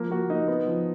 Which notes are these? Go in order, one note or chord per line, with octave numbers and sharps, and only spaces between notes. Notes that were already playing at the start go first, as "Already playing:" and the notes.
Already playing: F3 A#3
A#3 F#4
A#3 D#4
B3
F3